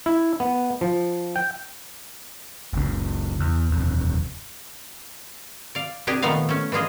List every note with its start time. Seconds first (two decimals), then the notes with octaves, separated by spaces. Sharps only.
0.06 E4
0.40 B3
0.81 F3
1.36 G5
2.73 F#1 C#2 C#3
3.40 E2
3.70 D#1 F2
5.75 D5 F5
6.07 C3 D4 G4 G#4
6.22 A#2 D#3 F3 A3 B3 F5
6.49 A3 C#4
6.72 E3 D4 F4 G#4 D#5